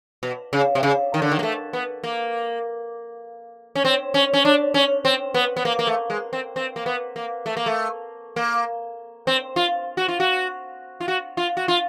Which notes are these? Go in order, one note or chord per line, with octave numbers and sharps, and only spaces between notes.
B2
C#3
C3
C#3
D#3
D3
D#3
A#3
A3
B3
A#3
C#4
C4
C#4
C#4
D4
C#4
C4
B3
B3
A#3
A#3
A3
G#3
C4
C4
A#3
B3
A#3
A3
A#3
A3
A#3
C4
F4
F#4
F4
F#4
F4
F#4
F4
F#4
F4